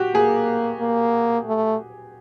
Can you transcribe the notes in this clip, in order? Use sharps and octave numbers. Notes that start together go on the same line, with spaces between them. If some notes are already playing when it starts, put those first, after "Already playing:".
Already playing: F#4 G4
A#3 G#4
A#3
A3